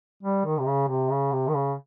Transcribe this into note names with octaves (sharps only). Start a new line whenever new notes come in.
G3
D#3
C3
C#3
C3
C#3
C3
D#3
C#3